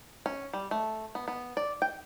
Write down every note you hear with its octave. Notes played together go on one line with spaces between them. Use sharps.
C#4
G3
A3
B3
B3
D5
G5